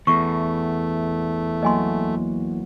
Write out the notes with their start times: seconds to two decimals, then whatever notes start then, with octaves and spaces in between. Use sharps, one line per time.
0.07 E2 A3 C#6
1.63 F#3 A#3 D#5 G#5 C6